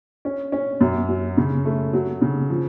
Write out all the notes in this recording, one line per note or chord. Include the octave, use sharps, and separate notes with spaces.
C#4
C#4
F#2
F#3
C#3
A3
F#3
C#3
F3